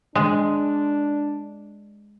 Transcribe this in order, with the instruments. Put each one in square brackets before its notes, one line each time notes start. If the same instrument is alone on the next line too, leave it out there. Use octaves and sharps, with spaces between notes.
[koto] G#3 [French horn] D4